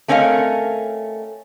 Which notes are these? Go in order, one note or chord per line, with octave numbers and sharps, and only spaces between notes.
A3 C4 C#4 A#4 D#5 F5